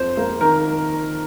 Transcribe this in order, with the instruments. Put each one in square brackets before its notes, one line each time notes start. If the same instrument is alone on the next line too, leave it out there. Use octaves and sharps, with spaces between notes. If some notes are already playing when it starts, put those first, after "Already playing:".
Already playing: [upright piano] F2 [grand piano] C5
[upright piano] A#3
[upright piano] D#3 [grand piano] A#4